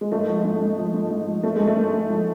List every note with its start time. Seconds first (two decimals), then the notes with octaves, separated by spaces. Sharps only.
0.01 G#3
0.12 G#2 A3
0.28 F3
0.45 G#2
0.61 G#2
0.78 F3
0.94 G#2
1.11 G#2
1.27 F3
1.43 G#2 A3
1.56 G#2 G#3
1.68 A3
1.76 G#2
1.93 G#2
2.09 F3